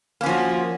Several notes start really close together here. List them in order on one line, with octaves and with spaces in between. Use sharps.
A#3 C#4 F3 F#4